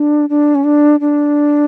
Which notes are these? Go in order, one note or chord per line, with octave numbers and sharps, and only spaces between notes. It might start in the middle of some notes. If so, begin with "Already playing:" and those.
Already playing: D4
D4
C#4
D4
D4